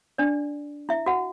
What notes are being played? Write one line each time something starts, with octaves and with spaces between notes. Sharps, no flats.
D4 D5
E4 E5
F#4 F#5